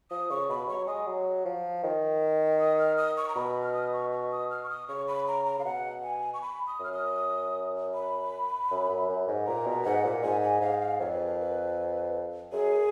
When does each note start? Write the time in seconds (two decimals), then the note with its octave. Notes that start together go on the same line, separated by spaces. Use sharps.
0.11 F3 D#6
0.30 C#3 C#6
0.49 B2 B5
0.68 F#3 C#6
0.88 G#3 D#6
1.07 F#3
1.45 F3
1.83 D#3
2.60 D#6
2.79 F6
2.98 D#6
3.17 C#6
3.29 A#5
3.36 B2 B5
3.63 F6
3.74 D#6
3.93 C#6
4.12 C#6
4.31 D#6
4.50 F6
4.63 C#6
4.69 D#6
4.89 C#3 C#6
5.08 B5
5.28 A#5
5.46 A#5
5.59 C#3 F5
5.65 B2 F#5
6.03 G#5
6.34 C#6
6.42 B5
6.67 D#6
6.80 F#2 F6
6.93 D#6
7.95 B5
8.71 F#2
8.89 F#2
9.09 F#2
9.28 G#2
9.47 A#2 A#5
9.67 B2
9.85 G#2 F#5
10.04 A#2
10.24 G#2 G#5
10.43 G#5
10.61 G#2 F5
10.81 F5
11.00 F2 C#5
11.13 B4
11.26 A#4
11.39 B4
12.52 F#2 G#4